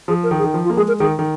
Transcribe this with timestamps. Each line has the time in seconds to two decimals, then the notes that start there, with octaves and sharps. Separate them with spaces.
0.08 F3 G#4
0.23 A#4
0.31 D#3
0.39 G#4
0.44 D#3
0.54 F3
0.65 F4
0.70 A#3
0.77 G#3 G#4
0.88 A#4
0.99 D#3 G#4
1.19 D#3